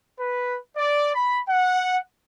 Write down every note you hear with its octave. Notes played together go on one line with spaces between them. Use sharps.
B4
D5
B5
F#5